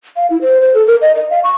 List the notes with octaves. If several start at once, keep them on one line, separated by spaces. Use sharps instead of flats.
F5
E4
C5
C5
A4
A#4
D#5
D#5
F5
C#6